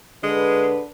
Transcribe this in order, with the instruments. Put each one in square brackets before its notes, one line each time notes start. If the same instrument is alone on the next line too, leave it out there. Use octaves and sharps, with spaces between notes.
[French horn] D3 [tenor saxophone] G#3 [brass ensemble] B4